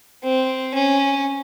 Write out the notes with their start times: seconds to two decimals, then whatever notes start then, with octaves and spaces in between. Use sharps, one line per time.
0.23 C4
0.74 C#4